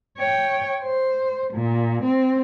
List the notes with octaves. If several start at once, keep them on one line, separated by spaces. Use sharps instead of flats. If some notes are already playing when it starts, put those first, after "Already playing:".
C#5 G5
C5
A#2
C4